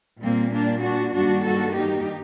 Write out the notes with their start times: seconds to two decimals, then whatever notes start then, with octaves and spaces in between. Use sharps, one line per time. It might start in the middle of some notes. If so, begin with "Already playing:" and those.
0.23 A#2 G3 A#3 C4
0.53 A#3 D4
0.84 D4 F#4
1.15 G2 D#3 G3 A#3 D4 F#4
1.45 F#4 A4
1.76 D#4 G4